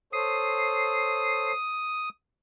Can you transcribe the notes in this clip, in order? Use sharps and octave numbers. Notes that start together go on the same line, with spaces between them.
A4 C5 C#5 D#6 C7